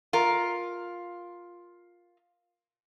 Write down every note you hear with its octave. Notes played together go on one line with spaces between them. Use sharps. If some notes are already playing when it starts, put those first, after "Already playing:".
F4 A#4